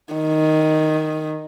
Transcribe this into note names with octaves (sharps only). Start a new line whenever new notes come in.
D#3